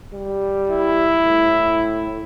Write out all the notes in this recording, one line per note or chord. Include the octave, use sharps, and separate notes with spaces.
G3
E4
A2